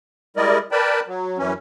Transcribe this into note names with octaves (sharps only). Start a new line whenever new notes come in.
G3 G#3 E4 A#4 D5 D#5
A#4 B4 D5 G5 A5 B5
F#3
F#2 E3 C#4